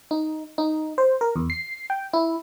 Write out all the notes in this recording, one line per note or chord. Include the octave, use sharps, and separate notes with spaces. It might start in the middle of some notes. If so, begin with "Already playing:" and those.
D#4
D#4
C5
A#4
E2
C7
G5
E4